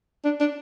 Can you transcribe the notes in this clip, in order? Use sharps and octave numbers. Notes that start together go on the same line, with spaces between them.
D4
D4